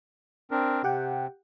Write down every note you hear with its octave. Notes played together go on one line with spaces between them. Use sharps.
C4 D4 A#4
C3 G4 F#5 G5